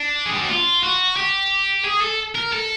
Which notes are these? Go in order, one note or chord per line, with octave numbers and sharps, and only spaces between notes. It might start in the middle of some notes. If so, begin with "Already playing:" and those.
Already playing: D4
G#4
G4
F#4
F4
F#4
G4
G#4
A4
A#4
A4